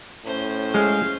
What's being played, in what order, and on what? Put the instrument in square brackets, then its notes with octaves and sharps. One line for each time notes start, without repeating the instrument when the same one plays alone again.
[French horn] A2 [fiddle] C#4 C5
[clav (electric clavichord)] G#3 [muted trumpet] F5